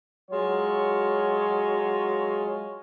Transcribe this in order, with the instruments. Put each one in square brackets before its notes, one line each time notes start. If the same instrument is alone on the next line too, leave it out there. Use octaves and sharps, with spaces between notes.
[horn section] F#3 G#3 F4 C#5